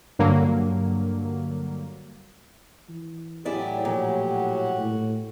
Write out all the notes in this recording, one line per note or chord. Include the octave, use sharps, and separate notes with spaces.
G2 D3 F#3 A#3
E3
A2 F#3 E4 G4 G#4 D5
A#2 F3 F#4
A2